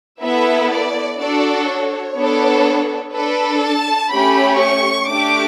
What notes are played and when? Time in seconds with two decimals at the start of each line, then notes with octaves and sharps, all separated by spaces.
0.21 B3 E4 A4 E5
0.70 D5
1.19 D4 F#4 A4 D5
1.68 C#5
2.16 B3 D4 A4
3.14 D4 A4 B4
3.63 A5
4.12 A3 C#4 G4 B5
4.61 C#6
5.10 A3 D4 G4 D6